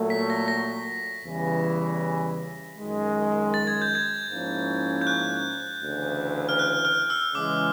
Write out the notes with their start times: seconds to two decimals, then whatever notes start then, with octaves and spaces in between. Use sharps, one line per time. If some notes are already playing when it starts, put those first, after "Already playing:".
Already playing: A#2 F#3 A3
0.10 B6
0.30 A#6
0.48 A#6
1.25 E2 C#3 E3 G3
2.78 F#2 D#3 G#3
3.54 A6
3.67 G#6
3.82 G6
3.95 G#6
4.30 G#2 F3 A#3 C#4 E4
5.01 G6
5.07 F#6
5.83 D2 C#3 E3
6.49 F6
6.59 F#6
6.85 F6
7.10 E6
7.35 C#3 E3 G#3 D6